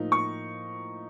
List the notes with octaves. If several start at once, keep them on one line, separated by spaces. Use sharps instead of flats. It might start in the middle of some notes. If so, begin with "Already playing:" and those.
Already playing: A2 F3 A#3 D#4
C#6